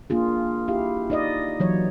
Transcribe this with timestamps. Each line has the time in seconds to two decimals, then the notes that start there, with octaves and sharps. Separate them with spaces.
0.10 A#3 D4 F4 G#4
0.68 E4 G4 F5
1.10 D#4 D5 D#5
1.60 E3 F#3 C#5